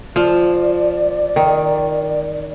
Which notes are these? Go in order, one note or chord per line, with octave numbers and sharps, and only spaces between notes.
F3 D5
D#3